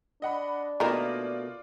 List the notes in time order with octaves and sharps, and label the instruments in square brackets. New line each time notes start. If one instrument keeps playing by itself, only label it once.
[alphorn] D4 [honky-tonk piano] D#5 F#5 B5
[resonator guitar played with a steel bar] B2 A3 A#3 [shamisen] D#3 A#4 [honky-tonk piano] F4 D5